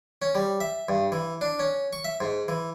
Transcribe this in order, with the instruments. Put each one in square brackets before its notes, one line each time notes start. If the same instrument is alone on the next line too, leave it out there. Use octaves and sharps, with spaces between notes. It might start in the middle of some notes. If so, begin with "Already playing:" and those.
[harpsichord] C#4
G3
E5
G2
E3
D4
C#4
C#6
E5
G#2
E3